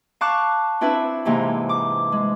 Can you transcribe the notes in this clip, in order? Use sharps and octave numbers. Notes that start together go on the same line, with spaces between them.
F5 A5 C#6 D6 F#6
C4 D4 E4 B4 E5
G#2 C3 E3 A#3
D6
G#3